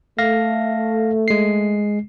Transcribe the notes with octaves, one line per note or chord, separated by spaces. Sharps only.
A3 F5 A#6
G#3 C7